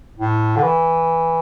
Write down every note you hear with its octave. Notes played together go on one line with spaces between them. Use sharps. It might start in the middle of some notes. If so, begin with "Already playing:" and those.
A2
D3
E3